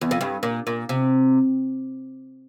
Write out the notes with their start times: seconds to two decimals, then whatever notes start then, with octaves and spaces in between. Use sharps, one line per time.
0.01 E2
0.11 F2
0.21 G2
0.43 A#2
0.67 A#2
0.89 C3